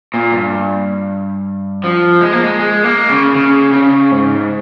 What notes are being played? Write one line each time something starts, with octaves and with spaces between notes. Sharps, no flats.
A#2
G2
F3
G#3
A#3
G#3
G#3
A#3
C#3
C#3
C#3
G#2